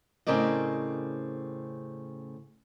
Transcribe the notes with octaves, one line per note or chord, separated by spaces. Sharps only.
A2 C#3 C4 A#4 D5 D#5